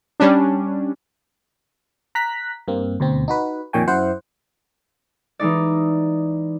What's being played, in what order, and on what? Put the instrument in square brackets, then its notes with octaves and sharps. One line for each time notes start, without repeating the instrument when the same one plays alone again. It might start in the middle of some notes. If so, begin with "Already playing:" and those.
[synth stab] G3 C#4 D4
[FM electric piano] A#5 F#6 B6
G2 A#3 C4
D2 B2 C4
D#4 F#4 B4
F2 A#2 D#3 C#5 G5 G#5
F#2 E4 C5 F#5
[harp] E3 G#3 D#4 D5